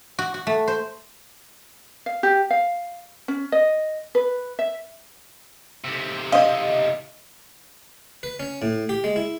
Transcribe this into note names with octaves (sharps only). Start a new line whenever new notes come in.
F#4
F#4
A3
C5
F5
G4
F5
C#4
D#5
B4
E5
B1 C3
C#5 D#5 F5
B4
C#4
A2
G4
G#3
E4